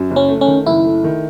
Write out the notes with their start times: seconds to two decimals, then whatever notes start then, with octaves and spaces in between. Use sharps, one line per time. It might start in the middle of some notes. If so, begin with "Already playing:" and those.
Already playing: F#2
0.11 F#1
0.16 C#4
0.29 A3
0.41 C#4
0.47 D#3
0.66 F#1 E4
0.84 A3
1.04 D#3